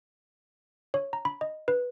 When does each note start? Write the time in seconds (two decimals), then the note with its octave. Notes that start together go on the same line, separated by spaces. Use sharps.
0.94 C#5
1.13 A#5
1.25 B5
1.41 D#5
1.68 B4